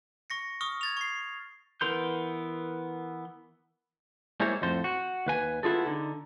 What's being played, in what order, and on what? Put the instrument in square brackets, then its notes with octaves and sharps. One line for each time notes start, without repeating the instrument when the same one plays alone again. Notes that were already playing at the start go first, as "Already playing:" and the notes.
[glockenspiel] C#6 A#6 C#7
C#6 D#6 F6
G#6 A6 F7
C#6 C7
[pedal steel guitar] E3 B3 A#4 C6 G6
[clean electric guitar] G3 G#3 A#3 E4 C5 C#5
F2 A2 A4 C5
F#4
D#2 B4 G#5
B3 E4 F4 G#4 A4
D3 D#4